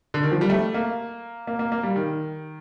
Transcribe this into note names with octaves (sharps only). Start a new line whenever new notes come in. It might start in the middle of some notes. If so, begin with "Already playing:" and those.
D3
D#3
F3
G3
A3
A#3
A#3
A#3
A#3
G3
D#3